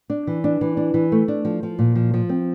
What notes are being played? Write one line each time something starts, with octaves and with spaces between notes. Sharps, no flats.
D4
E3
D4
E3
D4
E3
A3
D4
F3
F3
A#2
F3
F3
C4